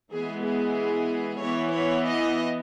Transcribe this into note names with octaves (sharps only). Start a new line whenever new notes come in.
E3 G#3 B3 G#4
G#4
E3 B3 C#5
C#5
D#5